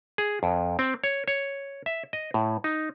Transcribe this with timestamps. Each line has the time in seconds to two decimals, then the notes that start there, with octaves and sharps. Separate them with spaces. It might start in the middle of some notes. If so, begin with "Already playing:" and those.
0.18 G#4
0.43 F2
0.79 C4
1.04 C#5
1.28 C#5
1.86 E5
2.13 D#5
2.34 A2
2.64 D#4